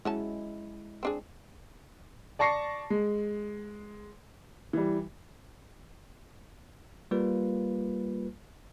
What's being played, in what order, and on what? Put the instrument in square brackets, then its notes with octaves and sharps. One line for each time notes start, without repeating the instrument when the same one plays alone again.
[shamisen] F#3 C#4 A5 [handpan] G#3 E4
[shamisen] C4 D4 G#4
[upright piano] D5 A5 C#6 A#6 C7 C#7
G#3
E3 G3
[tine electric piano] G3 A#3 F4 B4